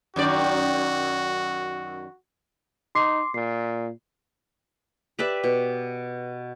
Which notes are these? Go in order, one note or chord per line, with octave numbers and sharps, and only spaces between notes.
F#2 D#3 F#4 D5
D#4 C6 D6 C7
A#2 C7
G4 B4 D5 E5
B2